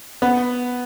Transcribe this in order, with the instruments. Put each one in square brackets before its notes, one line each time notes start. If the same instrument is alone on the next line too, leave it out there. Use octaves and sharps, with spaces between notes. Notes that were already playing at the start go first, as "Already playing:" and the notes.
[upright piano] B3